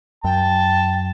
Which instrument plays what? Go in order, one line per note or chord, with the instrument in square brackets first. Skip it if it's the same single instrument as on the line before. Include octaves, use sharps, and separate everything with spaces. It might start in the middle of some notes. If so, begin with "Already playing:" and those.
[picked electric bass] F#2 [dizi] G5 [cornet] A5